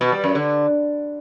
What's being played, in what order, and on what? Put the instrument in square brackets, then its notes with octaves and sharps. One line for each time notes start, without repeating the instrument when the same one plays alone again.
[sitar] B2
G3
F#2
D3